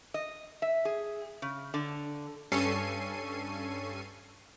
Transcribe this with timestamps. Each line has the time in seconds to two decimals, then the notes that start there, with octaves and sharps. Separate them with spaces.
0.14 D#5
0.62 E5
0.85 G#4
1.42 C#3
1.74 D3
2.52 G2 C#4 A4 C#6 C7 D#7